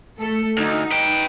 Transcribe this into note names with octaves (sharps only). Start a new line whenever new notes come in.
A3 A4
D2 D#4
B4 G5